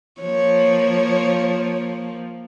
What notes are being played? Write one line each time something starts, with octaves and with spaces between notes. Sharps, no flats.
F3 A#3 C#5